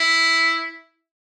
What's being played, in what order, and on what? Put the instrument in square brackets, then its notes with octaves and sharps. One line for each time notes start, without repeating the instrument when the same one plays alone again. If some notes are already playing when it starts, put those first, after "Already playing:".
Already playing: [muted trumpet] E4